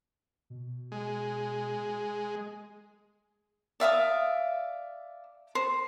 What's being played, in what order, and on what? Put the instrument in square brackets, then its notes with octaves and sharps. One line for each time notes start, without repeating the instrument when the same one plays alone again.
[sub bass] B2
[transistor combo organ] G#3
[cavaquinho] D5 E5 F5 D#6
C5